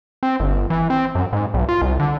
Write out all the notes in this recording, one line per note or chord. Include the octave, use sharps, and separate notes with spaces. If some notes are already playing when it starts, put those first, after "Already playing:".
C4
G1
E3
C4
F#2
G#2
B1
F4
C2
D3